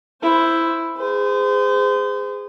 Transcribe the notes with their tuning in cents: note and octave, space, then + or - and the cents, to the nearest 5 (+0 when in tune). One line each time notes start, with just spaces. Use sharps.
E4 +5 C5 +0
G#4 -20 C5 -35